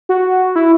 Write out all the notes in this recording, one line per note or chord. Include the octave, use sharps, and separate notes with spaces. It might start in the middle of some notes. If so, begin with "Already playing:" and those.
F#4
E4